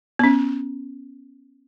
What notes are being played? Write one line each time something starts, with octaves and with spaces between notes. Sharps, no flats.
B3 C#4